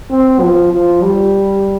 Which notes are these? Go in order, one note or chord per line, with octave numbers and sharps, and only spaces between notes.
C4
F3
F3
G3